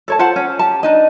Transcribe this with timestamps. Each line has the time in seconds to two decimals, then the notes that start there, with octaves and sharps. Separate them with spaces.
0.08 A4 C#5 A5
0.19 F4 C5 F#5 A5
0.36 C#4
0.59 G4 A5
0.83 D4 D#4 D#5